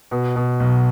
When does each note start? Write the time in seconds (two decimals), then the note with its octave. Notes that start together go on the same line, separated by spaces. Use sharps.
0.11 B2
0.36 B2
0.60 B1